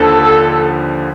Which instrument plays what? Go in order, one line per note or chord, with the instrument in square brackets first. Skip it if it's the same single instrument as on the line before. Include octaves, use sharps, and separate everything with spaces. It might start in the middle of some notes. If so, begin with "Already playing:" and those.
Already playing: [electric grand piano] D#2 D3 F3 [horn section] A4